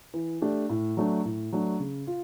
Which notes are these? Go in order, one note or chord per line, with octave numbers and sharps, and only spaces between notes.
E3
A3 D4 G4
A2
F#3 A3 D4
A2
F#3 A3 D4
C#3
F4